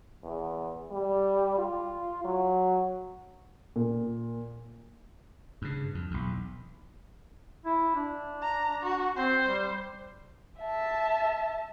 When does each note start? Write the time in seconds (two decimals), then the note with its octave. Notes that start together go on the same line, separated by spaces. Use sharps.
0.24 E2
0.92 G3
1.58 F4
2.25 F#3
3.76 A#2
5.62 G2 C#3
5.95 F2
6.11 B1 E2
7.65 E4
7.96 D4
8.42 A#5
8.83 F#4
9.16 C4 C5
9.45 G3
10.60 E5 A5